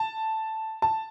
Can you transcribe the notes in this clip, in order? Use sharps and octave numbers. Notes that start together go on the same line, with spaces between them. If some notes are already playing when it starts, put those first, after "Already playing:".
Already playing: A5
A5